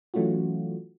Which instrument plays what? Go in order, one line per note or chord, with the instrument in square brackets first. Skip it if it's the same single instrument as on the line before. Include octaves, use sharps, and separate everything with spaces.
[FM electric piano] E3 F#3 A3 C#4 F4 F#4